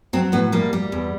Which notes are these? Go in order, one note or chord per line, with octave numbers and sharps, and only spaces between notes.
F#3 C4
A2 B3
G3 A#3
G3
E2